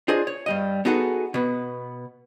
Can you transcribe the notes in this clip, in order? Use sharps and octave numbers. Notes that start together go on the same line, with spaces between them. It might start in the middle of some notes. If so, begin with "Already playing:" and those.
D4 F4 G#4 C5 D#5
C#5
G2 G3 D#5
B3 D#4 F#4 G#4 A4 F#5
B2 B3